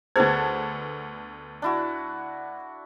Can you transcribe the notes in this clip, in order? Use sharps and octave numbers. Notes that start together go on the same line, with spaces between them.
D2 B3 G#4 A4 C5 F#5 A5 G#6
D4 E4 F#4